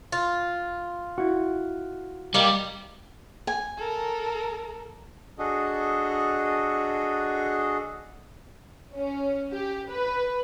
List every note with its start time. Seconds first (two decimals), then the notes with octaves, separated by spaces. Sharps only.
0.12 F4
1.18 E4 F#4
2.34 D#3 G3 A#3
3.47 G#5
3.77 A4 A#4
5.39 D4 F#4 G#4 A4 D#5
8.97 C#4
9.52 G4
9.88 B4